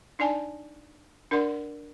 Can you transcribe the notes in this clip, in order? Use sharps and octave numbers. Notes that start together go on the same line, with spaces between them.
D4 D#4 D5 G#5 A5
D4 A#4 D5 F#5 C6